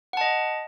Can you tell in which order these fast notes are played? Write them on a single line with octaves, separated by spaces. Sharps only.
F#5 A5 D#5